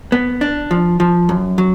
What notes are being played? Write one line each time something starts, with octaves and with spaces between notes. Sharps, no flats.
B3
D4
F3
F3
F#2
F#3